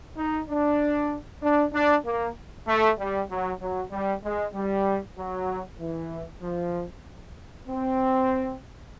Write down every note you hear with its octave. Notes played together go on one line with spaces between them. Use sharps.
D#4
D4
D4
D4
A#3
A3
G3
F#3
F#3
G3
G#3
G3
F#3
E3
F3
C4